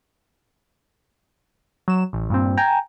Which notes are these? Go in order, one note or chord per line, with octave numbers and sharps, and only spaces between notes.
F#3 E7
A1
G2 A#2 C4
G5 G#5 A#5 G6